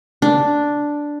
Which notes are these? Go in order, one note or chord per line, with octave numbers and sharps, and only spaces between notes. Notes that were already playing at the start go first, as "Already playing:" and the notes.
D4